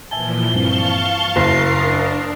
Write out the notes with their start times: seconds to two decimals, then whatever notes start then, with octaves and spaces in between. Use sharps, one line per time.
0.11 A#2 E3 F3 E5 G#5 A5 G7
0.55 G2 C4 F5 A5 C#6
1.36 F#1 C#3 E4 A#4 F6 C7
1.78 D4 D#6 A6 A#6